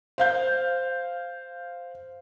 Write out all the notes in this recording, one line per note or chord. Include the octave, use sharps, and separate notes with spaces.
C5 F5 G6